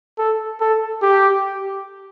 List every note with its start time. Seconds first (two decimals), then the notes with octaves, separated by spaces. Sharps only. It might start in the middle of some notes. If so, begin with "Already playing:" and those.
0.18 A4
0.61 A4
1.02 G4